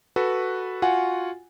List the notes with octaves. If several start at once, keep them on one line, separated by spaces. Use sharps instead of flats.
F#4 A4 B4
F4 F#4 F#5 G#5